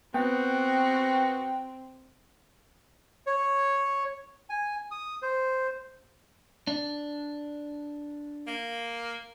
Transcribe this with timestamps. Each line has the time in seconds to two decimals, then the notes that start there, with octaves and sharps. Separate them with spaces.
0.14 B3 C4 F#4 G5
3.26 C#5
4.50 G#5
4.91 D#6
5.22 C5
6.67 D4
8.47 A#3